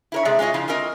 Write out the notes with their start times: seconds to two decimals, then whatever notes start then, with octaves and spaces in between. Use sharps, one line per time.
0.12 E4 A#4 C#5
0.25 C3 G#3 G#4 D5 E5
0.39 G#3 C#4 F4 C#5 D#5
0.54 C#3 F3 E4 F4
0.68 C4 C#4 F4 A#4 D#5